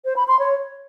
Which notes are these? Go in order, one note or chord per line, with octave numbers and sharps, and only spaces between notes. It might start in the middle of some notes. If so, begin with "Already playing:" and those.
C5
B5
C6
C#5